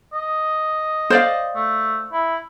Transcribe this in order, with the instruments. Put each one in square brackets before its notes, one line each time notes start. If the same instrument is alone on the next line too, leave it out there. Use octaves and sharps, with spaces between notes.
[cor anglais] D#5
[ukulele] C5 D5 F5
[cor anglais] A3
E4